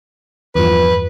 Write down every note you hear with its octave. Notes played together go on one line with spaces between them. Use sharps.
E2 G2 F3 B4